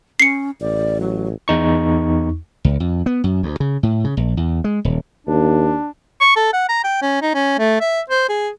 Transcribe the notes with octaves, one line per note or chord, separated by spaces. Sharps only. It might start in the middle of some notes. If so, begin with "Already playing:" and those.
C#4 C7 C#7
A1 D5
F#3
E2 D#4 C#6
C#2
F2
B3
F#2
D2
C#3
A2
C#3
A#1
E2
G#3
D#1
D#2 D4
C#6
A4
F#5
A#5
G5
C#4
D#4
C#4
A3
E5
C5
G#4